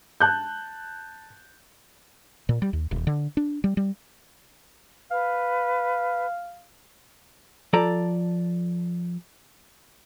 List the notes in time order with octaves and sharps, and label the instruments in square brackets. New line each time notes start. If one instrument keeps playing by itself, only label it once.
[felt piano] A5 F#6 G6
[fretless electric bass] A#2
G3
D#2
D#1
D3
D4
G3
G3
[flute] B4 [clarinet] F5
[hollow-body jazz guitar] F3 A4 D5 A#5